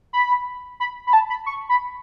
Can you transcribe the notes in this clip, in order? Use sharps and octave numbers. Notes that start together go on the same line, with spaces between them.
B5
B5
B5
A5
B5
C#6
B5